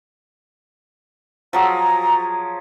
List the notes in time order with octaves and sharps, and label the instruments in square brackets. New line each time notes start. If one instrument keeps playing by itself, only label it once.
[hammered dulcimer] F3 F#3 G#4 [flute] A#5